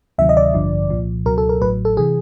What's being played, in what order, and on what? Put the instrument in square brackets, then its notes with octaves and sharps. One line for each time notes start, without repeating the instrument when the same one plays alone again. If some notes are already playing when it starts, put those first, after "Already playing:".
[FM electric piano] D2 C3 D#3 F#3 E5
D#5
D5
A1 G2 D3 F3
C2 A#2 F3
C#2 B2 F#3 A#4
A4
A#4
A1 A2 F#3 B4
A4
C3 E3 G#4